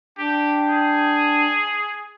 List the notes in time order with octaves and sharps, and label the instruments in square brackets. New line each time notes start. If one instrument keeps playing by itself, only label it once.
[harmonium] D4 [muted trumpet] G4 [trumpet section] G5
[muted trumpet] G#4